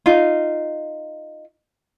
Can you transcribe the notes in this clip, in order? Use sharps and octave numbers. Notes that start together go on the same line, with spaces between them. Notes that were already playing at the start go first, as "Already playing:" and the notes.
D#4 F4